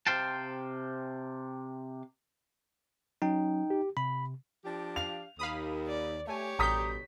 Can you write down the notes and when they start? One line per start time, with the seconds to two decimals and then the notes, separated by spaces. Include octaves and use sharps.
0.07 C3 C5 F5 G5 A5
3.22 F#3 C#4 D#4 G5
3.70 G4
3.97 C3 B5
4.65 F3 D4 G4
4.96 F5 F7
5.39 D#2 F5 B5 D#6
5.87 D5
6.27 A3 G4 C#5 G#5
6.59 A1 B2 D3 G3 A#5 D#6 G6 B6